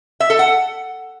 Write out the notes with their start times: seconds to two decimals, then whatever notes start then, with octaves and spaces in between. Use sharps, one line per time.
0.20 E5
0.30 A4
0.39 F#5